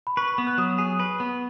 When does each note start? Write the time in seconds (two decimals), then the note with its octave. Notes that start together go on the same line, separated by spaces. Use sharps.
0.07 B5
0.17 B4 C#6
0.38 B3
0.47 F#6
0.58 F#3 D#6
0.78 G#4
1.00 B4
1.20 B3